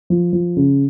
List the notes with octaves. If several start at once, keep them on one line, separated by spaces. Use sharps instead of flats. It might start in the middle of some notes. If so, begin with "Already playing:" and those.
F3
F3
C#3